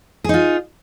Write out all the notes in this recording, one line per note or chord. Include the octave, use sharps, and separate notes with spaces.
D#4 F4 G#4